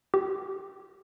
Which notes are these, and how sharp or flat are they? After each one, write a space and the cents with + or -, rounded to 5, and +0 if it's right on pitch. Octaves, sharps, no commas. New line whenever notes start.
G4 -15